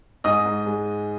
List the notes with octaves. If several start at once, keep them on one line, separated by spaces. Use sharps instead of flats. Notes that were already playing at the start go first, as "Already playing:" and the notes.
G#2 D#5 D#6
G#2
G#3